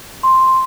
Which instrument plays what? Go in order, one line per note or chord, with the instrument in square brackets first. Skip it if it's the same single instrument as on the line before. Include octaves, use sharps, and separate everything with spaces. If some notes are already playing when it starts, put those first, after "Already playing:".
[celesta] C6